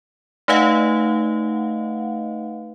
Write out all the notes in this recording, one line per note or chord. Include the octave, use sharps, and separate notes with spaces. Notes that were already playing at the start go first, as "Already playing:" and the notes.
A3 D#4 B4 D#5 F5 F#5